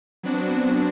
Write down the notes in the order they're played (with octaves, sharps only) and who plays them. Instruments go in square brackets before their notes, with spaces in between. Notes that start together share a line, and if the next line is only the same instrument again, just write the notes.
[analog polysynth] F#3 B3 C4 D4 F#4